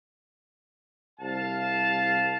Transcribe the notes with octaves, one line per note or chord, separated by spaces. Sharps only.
C2 F5 A5